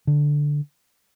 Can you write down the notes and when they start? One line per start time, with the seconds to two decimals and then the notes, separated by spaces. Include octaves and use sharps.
0.07 D3